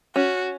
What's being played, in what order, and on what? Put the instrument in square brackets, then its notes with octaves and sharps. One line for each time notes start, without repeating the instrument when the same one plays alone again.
[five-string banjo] C#4 [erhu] F#4